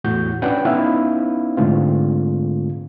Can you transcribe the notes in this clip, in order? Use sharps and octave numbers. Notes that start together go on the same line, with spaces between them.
E2 A2 F#4 G6
C#4 D4 B4 D5 F#5 G5
B3 C#4 D#4 E4 B4 F5
G#2 D3 G#3 A3 C4 F4